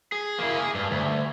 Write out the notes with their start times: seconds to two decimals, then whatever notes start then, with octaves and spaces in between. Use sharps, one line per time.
0.12 G#4
0.39 A#3 E4
0.57 G#4
0.74 G2
0.91 D2